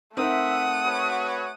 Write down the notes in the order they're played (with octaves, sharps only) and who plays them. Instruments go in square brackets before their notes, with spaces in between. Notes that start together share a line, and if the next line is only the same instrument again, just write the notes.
[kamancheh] A3 F#5 [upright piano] C4 D#4 A#4 [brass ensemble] E5 [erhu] D#6
[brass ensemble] F#4 B4 C#5